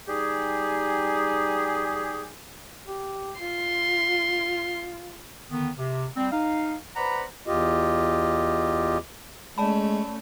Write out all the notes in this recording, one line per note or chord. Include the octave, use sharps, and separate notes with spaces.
G3 D#4 G4 G#4
G4
F4 C6
D3 D#3 B3
C3
G3 C4
D#4 F5
B4 C5 D5 F#5 A#5 B5
E2 F4 G4 D#5
G#3 A3 C#4 D5 A5 B5